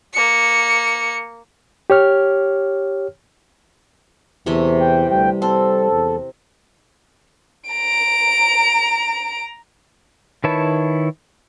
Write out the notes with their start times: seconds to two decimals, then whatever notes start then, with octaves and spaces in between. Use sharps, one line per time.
0.13 A#3 C#7
1.90 G4 C#5 F6
4.46 E2 C3 E3 A3
4.80 G5
5.11 D2 G3 G5
5.42 C4 A4
5.92 E2
7.70 A#5 D7
10.44 D#3 E4 B4 C#5 A5